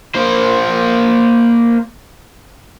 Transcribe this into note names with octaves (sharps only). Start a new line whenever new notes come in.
A#3 C5